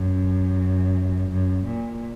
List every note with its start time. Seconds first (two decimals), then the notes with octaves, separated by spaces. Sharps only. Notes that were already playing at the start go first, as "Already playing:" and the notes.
Already playing: F#2
1.30 F#2
1.66 A#2